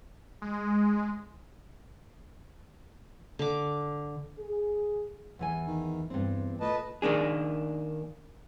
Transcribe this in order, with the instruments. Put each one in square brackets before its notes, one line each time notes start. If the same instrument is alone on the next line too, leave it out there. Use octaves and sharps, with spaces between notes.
[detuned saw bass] G#3
[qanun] D3 D6
[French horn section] G#4
[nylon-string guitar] E2 E3 G#5
[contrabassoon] D#3
[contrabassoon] E2 [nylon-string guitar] G2 C4
[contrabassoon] A#2 [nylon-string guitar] A3 [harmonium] B4 D#5 A5
[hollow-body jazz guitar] D#3 A#3 D4 G#4